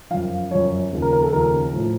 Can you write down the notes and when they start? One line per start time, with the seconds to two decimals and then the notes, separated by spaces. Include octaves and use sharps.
0.10 F#2 F3 F5
0.51 F#2 F3 C#5
0.92 D#2 C#3 F3
1.02 A#4
1.13 A#4
1.23 A4
1.33 D#2 C#3 F3 A#4
1.73 A2 F3